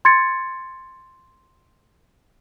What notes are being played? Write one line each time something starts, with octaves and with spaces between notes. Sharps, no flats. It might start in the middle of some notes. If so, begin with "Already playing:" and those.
C6 G#6 A6 C#7